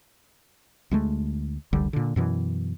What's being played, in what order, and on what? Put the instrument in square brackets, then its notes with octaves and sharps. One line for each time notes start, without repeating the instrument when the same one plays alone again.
[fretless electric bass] D2 G#3 A3
F1 C2 D3 G3
A#2 D3
F#2 B2 E3